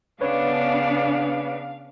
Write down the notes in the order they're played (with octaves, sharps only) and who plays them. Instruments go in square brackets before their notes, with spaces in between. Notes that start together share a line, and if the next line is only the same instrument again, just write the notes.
[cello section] C#3 B3 D4 [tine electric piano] B4 C#5 [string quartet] F5